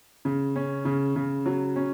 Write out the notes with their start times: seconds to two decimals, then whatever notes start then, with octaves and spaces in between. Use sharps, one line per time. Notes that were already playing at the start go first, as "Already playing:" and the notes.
0.25 C#3
0.56 C#4
0.85 C#3
1.16 C#3
1.46 F#3
1.76 C#4